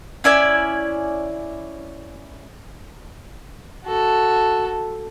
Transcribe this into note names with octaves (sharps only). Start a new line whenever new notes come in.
C#4 E4 D5 G#5
F#4 A4